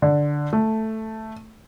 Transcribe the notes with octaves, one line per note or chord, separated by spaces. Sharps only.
D3
A3